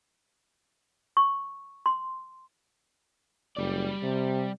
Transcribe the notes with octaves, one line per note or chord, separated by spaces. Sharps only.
C#6
C6
F#1 G3 D5
C3